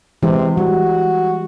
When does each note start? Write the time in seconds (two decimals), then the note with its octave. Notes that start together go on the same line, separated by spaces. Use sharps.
0.23 C3 E3 G#3
0.57 G3 F#4